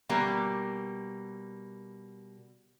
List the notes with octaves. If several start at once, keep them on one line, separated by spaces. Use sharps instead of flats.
B2 G3 A#3